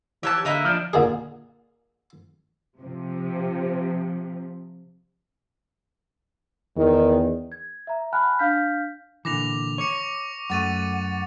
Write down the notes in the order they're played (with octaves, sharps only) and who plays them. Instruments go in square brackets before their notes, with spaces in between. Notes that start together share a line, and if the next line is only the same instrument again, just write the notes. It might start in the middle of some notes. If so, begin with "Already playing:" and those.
[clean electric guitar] E3 [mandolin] G4 C#5 A5
[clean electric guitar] D3 [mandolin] A#3 D#4 E4
[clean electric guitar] F3 D4
[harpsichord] A#2 D3 G#4
[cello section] C3 F3
[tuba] E2 [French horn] D#3
[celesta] G#6
E5 A#5
F#5 G#5 A5 B5 F6 F#6
D4 F5 F6 G6 B6
[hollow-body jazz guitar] A#2 D3 E3 [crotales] D6 A#6 F7
[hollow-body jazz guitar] C#5 [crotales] C#6 D6 C#7
[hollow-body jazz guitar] F#2 A3 [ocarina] F#5 [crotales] C#6 A6 D#7